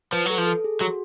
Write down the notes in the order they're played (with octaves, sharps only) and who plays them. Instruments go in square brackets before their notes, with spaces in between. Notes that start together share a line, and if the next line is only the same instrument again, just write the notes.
[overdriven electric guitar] F3 [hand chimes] B4
[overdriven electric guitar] F#3 [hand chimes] A4
[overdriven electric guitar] F3
[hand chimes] A4
G#4
[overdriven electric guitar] F#3 [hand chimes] F#4